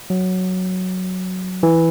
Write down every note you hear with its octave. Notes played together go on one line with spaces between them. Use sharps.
F#3
E3